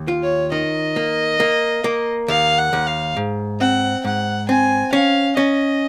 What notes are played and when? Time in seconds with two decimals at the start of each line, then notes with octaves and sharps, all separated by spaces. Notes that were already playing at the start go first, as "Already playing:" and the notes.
Already playing: D#2
0.08 F4
0.23 C#5
0.52 D#3 D#5
0.96 A#3
1.40 A#3
1.84 A#3
2.28 D#2 F5
2.58 F#5
2.73 D#2
2.87 F5
3.17 G#2
3.60 C4 F#5
4.05 G#2 F#5
4.49 C4 G#5
4.93 C#4 F5
5.36 C#4 D#5